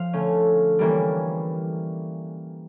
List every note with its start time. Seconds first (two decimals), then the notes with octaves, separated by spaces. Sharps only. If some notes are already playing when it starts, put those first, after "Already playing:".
Already playing: F3 F5
0.13 D3 A3 C#4
0.79 E3 G3 A#3 C#4